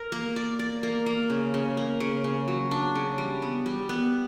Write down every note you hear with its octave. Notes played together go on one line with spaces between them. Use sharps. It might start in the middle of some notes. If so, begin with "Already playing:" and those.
Already playing: A#4
A#3
D5
D5
A#3
A#3
C#3
C#3
A#3
C#3
C#3
F#3
D4
C#3
G3
B3
G3
B3